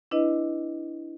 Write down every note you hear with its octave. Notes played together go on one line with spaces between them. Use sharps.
D4 E4 B4 D#5